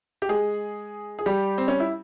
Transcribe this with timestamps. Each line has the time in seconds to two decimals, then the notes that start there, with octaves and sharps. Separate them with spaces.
0.22 G4
0.29 G#3 G#4
1.19 G#4
1.26 G3 G4
1.58 C4
1.68 C#4
1.80 E4